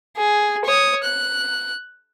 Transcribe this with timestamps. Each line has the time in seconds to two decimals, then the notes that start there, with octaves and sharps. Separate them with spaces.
0.17 G#4
0.65 C#5 D#6
1.03 F#6